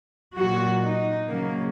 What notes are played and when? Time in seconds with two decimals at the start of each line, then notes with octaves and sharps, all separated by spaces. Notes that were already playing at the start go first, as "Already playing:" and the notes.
0.37 A#2 F#3 F#4
0.83 D#4
1.28 C#3 F#3 A#3